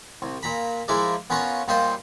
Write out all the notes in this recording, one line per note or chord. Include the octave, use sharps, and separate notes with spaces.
C2
A#2 A#5 B5
F3 G#3 E4 A#4 D5
B3 C#4 F4 A#4 C#5
A#2 G3 F4 C5 D#5 C6